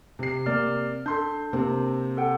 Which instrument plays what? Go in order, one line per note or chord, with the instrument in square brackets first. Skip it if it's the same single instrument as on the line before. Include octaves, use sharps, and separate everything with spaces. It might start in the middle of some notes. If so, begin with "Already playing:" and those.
[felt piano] C3 C7
[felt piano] C3 A#3 [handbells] D5 D6 F6
[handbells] D4 [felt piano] A4 C6 G6
[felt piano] C3 A#3 C4
[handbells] A4 F#5 G5